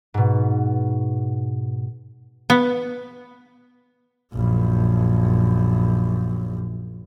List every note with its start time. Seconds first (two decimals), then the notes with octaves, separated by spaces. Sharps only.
0.14 G#2 B2
2.50 B3
4.34 A#1 F#2